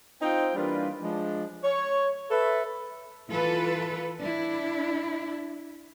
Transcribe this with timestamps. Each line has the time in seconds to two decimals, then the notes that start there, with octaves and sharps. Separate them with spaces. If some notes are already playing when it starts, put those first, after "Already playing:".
0.22 C4 D#4 F4 C5 G5
0.56 E3 G3 A#3 D4 F4 B4
1.01 F3 G#3 D4
1.64 C#5
2.31 A4 B4 E5
3.28 E3 F4 A4 B4
4.20 D4 E4